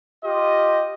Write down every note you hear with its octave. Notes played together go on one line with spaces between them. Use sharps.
F4 G4 D#5